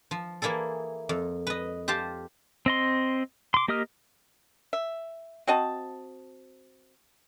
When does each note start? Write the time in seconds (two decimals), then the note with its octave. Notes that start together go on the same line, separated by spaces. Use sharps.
0.11 F3
0.42 E3 A#3 E4 G#4 A4
1.09 F2
1.47 B4 D#5
1.88 G4 C5 F5 A5
2.66 C4 D#5 C6
3.54 C6 D6
3.68 A#3 G4 D#5 D#6 F6
4.73 E5
5.47 C4 F#4 D#5 A5